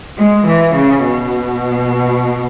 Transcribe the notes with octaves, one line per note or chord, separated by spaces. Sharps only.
G#3
E3
C#3
B2